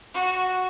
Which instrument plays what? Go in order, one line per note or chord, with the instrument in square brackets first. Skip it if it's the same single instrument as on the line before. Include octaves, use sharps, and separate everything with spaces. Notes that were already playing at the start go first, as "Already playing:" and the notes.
[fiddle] F#4